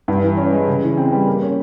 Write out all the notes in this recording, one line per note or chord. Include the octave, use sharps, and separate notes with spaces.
G2
E3
C#4
G#3
C#3
E3
C4
G3
A#3
C#4